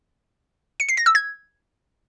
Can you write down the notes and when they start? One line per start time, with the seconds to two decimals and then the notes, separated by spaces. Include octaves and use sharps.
0.80 C#7
0.89 C7
0.97 A#6
1.06 E6
1.15 G#6